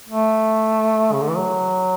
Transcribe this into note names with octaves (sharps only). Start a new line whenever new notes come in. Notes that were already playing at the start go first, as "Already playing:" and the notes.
A3
C#3
D3
E3
F#3